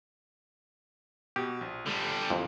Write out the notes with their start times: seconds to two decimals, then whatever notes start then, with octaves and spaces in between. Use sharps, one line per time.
1.36 B2 G4
1.61 A#1
1.86 D3 G3
2.30 F2 E3 A#3